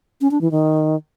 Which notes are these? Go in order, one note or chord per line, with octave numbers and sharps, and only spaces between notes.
C#4
D4
E3
D#3